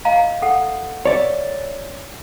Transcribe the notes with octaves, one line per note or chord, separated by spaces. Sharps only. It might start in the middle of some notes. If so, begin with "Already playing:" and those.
D#5 F5 A#5
A4 F#5
C#5 D5 E5